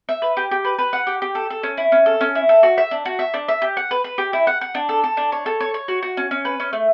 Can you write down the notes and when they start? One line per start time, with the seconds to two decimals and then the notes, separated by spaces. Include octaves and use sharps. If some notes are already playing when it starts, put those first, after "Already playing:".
0.09 E5
0.22 B4
0.37 G4
0.51 G4
0.65 B4
0.78 B4
0.93 F#5
1.07 G4
1.22 G4
1.35 A4
1.50 A4
1.63 C#4
1.78 E4
1.92 C#4
2.06 A4
2.21 C#4
2.35 E4
2.49 A4
2.63 F#4
2.78 E5
2.91 D4
3.05 F#4
3.19 E5
3.34 D4
3.48 E5
3.62 G4
3.77 F#5
3.91 B4
4.04 B4
4.18 G4
4.33 E4
4.47 F#5
4.61 F#5
4.75 D4
4.89 A4
5.04 A4
5.17 D4
5.32 C#5
5.46 A4
5.60 C#5
5.74 C#5
5.88 F#4
6.02 F#4
6.17 C#4
6.31 C#4
6.45 B4
6.60 C#4
6.73 A3